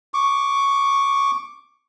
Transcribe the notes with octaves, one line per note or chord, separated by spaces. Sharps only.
C#6 D6